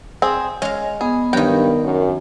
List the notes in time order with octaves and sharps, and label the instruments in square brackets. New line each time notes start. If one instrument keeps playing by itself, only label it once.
[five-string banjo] C4 G#4
[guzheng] G#3 F5 [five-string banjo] C#4
[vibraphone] B3 [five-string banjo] G#4
[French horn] G2 [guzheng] D#3 F#3 [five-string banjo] G5
[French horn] F#2